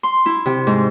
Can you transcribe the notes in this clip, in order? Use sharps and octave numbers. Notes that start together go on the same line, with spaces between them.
C6
E4
C3
G#2